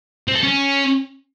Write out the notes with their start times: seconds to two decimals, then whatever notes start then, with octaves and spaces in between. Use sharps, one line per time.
0.28 C4
0.35 A4
0.43 C#4